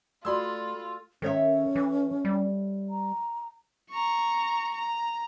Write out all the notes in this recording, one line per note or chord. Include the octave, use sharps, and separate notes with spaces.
A3 F4 F#4 D5 B5 C6 D#6 E6
D#3 C#4 A4 C#5 E5
E3
G3
A#5
A#5 C#6
A#5